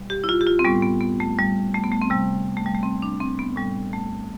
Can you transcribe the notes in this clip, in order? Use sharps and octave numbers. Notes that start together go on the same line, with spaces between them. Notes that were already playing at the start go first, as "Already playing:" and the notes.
Already playing: B2 G3
G4
E4
F4
G4
F4
C4
A2 G3 B3
B3
B3
A3
G3
A3
B3
A3
C4
C3 G3
A3
G3
A3
C4
D4
C4
B3
A2 G3
A3